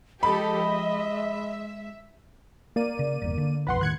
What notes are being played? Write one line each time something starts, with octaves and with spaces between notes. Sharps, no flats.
F3 G#3 G4 A4 D#5 B5
E5
A#3 D5 D#7
C#3
G1 E2
D3
E1 B1 F2 B4 F#5 C6
D#2 A2 D#3 F#6 G#6 C#7